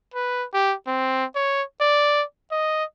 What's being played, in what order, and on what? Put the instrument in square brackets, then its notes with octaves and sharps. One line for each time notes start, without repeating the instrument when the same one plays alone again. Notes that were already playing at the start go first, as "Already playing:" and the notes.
[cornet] B4
G4
C4
C#5
D5
D#5